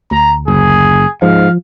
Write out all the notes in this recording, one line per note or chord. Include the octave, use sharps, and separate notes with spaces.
D2 A#5
F#1 G#4
G#2 F3 F5